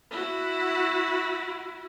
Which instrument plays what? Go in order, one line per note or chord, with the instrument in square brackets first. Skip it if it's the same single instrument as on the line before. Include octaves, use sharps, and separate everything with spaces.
[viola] E4 F#4